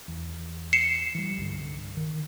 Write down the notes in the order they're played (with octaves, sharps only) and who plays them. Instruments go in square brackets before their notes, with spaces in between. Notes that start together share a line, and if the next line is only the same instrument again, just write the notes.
[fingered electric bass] E2
[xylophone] C7 C#7 E7
[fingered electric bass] E3 G3
C2 G2 D3
D#3